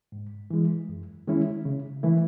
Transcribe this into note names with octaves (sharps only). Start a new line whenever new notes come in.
G#2
E3 G#3
F#2
D#3 G#3 C#4 E4
C#3
E3 A3 E4